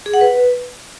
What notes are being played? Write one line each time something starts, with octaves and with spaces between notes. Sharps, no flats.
G#4
F#5
B4